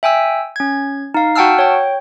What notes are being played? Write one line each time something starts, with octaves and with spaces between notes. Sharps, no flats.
E5 G5 G#5 E6
C#4 G#6
D#4 F5
F#4 F#5 G5 A5 E6 F6
C#5 G5